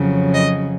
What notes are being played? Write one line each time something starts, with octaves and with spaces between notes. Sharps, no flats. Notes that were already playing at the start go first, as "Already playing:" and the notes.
Already playing: F2 C#3 F#3
D#5